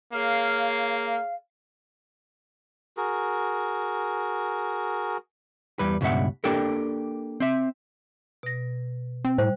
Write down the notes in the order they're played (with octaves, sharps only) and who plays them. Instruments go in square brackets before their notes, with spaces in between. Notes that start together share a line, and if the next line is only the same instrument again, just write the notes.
[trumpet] A#3 [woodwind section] G#4 C#5 F5
[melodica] F#4 G#4 A#4
[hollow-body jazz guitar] E2 G3 B4
C#2 G2 B2 E5 F#5
A#3 D4 G4 A4 A#4
C4 E5
[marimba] B2 A#6
[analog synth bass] C4
[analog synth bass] A2 [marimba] G3 [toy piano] C5